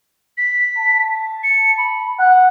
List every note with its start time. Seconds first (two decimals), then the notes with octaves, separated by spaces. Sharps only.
0.38 B6
0.78 A5
1.44 C#7
1.78 B5
2.19 F#5 F#6